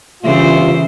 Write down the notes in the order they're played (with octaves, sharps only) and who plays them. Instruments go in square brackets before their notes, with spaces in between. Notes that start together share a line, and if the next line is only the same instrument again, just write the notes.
[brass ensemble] G1 F4 E5 [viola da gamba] C#3 E3 C5